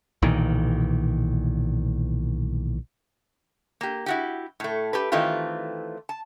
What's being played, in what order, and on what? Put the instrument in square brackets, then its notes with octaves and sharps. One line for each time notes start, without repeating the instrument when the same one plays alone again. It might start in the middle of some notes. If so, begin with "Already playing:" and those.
[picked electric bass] B1 A#2 D#3 E3
[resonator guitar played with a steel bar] A#3 G4
E4 F#4 G4
A2 A3
G4 A4 B4
D#3 E3 A3 C4 F4 G4
A5